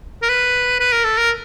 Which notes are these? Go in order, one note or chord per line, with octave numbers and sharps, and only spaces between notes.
A#4
B4
B4
A#4
A4
A#4